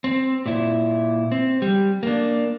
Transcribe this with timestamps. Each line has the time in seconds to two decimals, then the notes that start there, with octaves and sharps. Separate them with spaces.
0.04 C4
0.46 A#2 E4
1.32 C4
1.62 G3
2.03 A#3 D4